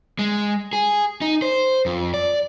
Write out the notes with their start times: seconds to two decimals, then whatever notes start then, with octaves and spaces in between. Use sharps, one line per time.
0.19 G#3
0.73 G#4
1.21 D#4
1.42 C5
1.86 F2
2.14 D5